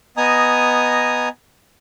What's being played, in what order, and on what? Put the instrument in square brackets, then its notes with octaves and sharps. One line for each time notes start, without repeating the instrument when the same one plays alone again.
[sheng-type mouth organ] B3 D#5 G#5 A#5 D#6